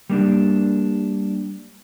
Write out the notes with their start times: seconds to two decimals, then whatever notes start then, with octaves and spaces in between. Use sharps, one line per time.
0.10 G3 A#3 D4